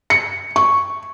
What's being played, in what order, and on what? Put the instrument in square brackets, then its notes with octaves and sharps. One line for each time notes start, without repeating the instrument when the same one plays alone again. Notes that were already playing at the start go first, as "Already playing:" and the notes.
[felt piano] C#7
C#6